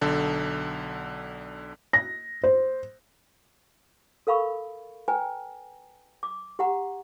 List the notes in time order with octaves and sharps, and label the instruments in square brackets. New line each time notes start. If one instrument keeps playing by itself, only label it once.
[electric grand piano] B1 D3 A4
[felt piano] A#6
C5
[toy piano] A4 A#4 F5 B5 C#6
B4 G5 G#5 A#5
D6
G4 F#5 A#5